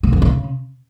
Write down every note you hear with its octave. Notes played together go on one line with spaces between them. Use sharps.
C#3
F2
C#3